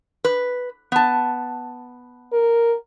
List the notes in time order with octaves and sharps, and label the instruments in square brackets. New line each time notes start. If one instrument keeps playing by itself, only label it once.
[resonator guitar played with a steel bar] B4
B3 A5
[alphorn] A#4